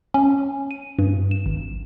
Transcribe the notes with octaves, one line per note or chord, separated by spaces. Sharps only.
C#4
D#7
G2
E7
G#1